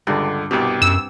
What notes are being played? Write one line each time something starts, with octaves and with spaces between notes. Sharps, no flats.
C#2 G2 D3 D5
C2 B2 C4 G4 D5
F#2 E6